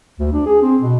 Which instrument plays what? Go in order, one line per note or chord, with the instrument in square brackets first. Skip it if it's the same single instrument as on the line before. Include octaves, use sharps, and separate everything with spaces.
[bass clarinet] D2
D4
G#4
C4
B2